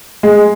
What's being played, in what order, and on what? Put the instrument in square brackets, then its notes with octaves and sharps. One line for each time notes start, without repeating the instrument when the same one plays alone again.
[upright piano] G#3